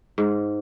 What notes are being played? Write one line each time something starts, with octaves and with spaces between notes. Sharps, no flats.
G#2